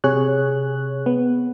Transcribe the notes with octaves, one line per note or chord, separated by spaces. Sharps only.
C3 G#4 C#5 F#6
B3